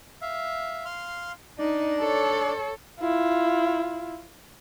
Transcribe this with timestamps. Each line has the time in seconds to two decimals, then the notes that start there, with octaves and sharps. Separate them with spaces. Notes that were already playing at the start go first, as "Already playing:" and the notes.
0.21 E5 F5
0.85 F5 C6 F6
1.59 D4 D#4 D5
1.99 A4 C#5
3.00 E4 F4